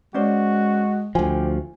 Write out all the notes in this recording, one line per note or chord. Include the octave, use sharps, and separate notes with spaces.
G#3 C#4 F#4 C5 D5
D2 F3 G4 G#5